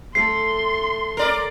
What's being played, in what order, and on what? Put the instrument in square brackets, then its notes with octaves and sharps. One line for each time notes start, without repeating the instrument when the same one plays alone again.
[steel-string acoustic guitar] A3 A4 [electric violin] C6 [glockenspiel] C7
[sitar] A#4 D5